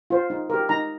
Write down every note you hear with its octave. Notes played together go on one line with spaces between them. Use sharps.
F4 C5
D#4
G4 A#4
D#4 A#5